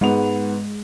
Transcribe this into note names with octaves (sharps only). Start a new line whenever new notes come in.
G#2 G#3 B3 F7